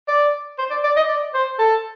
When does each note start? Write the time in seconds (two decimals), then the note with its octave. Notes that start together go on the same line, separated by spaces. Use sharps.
0.08 D5
0.58 C5
0.70 D5
0.84 D5
0.96 D#5
1.08 D5
1.34 C5
1.59 A4